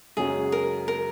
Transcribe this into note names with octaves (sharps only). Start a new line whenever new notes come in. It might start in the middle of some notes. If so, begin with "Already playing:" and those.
F#2 C#3 G#3 C#4 F#4 G#4
A#4
A#4